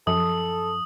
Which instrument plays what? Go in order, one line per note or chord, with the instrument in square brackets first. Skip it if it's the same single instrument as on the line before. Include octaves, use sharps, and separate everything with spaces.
[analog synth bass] F#2 [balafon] F3 [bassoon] A4 [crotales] D#6